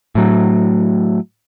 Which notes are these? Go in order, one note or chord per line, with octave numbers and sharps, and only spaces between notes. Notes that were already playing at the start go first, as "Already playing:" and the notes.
A2 F#3